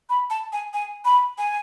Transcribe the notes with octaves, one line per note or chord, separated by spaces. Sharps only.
B5
A5
G#5
G#5
B5
G#5